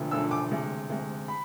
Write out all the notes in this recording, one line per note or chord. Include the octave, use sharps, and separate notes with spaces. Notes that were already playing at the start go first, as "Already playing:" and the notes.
Already playing: E1 D2 D3 F3 A3
E1 D2 D3 F3 A3 E6
D6
D2 C3 G#3
D2 C3 G#3
B5